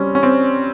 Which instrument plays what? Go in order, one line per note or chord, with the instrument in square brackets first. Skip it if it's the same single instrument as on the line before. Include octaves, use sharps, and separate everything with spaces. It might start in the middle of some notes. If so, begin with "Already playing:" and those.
Already playing: [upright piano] G3 [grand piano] C4 C#4
[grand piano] C#4
C4